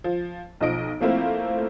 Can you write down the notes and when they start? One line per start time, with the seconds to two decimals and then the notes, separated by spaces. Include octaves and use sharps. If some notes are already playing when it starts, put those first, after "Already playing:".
0.04 F3
0.61 B1 F3 D#5 D7
1.00 F3 A3 A#3 C4 E4 F4